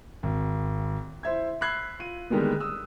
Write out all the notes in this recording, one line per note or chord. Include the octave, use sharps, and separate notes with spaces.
G#1
E4 C5 E5 G#6
B5 E6 F#6 G#6 C7
F4 D#7
D3 D#3 G3 G#3 A#3 B3
D#6 E6